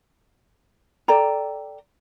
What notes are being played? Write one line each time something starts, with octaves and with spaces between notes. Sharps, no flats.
A4 D5 G5 A#5